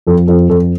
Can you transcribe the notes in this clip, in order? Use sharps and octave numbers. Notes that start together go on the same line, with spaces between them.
F2 A4
F2 A4
F2 A4